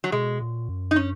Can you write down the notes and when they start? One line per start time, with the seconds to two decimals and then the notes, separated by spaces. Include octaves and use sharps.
0.04 F#3
0.12 B2 G#3
0.41 A#2
0.69 F#2
0.91 D#4
0.96 C#4